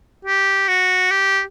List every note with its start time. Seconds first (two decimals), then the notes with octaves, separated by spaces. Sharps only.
0.25 G4
0.68 F#4
1.11 G4